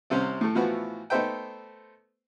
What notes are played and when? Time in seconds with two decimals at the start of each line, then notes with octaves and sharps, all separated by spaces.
0.10 C2 C3 C4 C#4
0.41 A2 A3
0.55 A2 E3 F3 B3 E4 F#4
1.10 A3 B3 D#4 C5 E5 G5